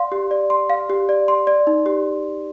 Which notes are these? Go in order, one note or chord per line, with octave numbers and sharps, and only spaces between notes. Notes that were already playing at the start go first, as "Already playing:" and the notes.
Already playing: D5 F5 C6
G4
D5
C6
F5
G4
D5
C6
D5
D#4
G4